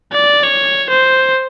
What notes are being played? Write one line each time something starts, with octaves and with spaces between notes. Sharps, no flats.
D5
C#5
C5